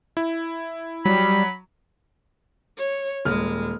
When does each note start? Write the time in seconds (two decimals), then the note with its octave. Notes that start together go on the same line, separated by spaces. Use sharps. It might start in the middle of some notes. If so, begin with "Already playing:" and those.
0.17 E4
1.06 F#3 G3 B5
2.78 C#5
3.25 D#1 G#3 F6